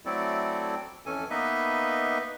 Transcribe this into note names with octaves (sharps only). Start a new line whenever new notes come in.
F#3 A3 C4 E4 A4 D5
F2 E3 C#4 A4 G#5
A#3 B3 D#4 B4 D#5 E5